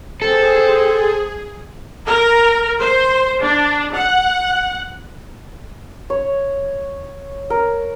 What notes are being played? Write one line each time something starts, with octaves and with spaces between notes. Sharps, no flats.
C4 G#4 A4 C5
A#4
C5
D4
F#5
C#5
A#4